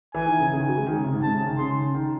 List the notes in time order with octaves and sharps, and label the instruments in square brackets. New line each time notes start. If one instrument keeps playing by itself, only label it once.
[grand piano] E3 [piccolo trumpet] G#5
[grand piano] D#3
C#3
C#3
D#3
F#3
G#3
D#3
C#3
C3
G#2
[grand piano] C3 [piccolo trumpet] A5
[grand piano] C#3
D#3
[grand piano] C#3 [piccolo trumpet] C6
[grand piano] D#3